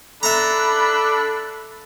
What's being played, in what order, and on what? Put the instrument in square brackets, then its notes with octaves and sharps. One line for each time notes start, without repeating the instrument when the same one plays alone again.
[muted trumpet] D4 [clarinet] A4 [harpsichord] E5 A#5 [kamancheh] B5 F#6